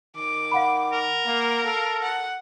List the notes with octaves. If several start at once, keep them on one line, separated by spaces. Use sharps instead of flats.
D#3 D6
F5 F#5 B5
A#4
A#3 A#5
A4 F5
F#5